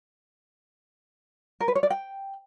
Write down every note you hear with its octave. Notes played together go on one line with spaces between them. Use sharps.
A#4
B4
C#5
D5
G5